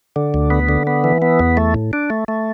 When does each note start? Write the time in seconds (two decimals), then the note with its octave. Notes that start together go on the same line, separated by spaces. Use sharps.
0.16 D3
0.34 D2
0.50 B3
0.69 D3
0.87 B3
1.04 E3
1.22 B3
1.39 E2
1.57 A3
1.74 A2
1.93 D4
2.10 A3
2.28 A3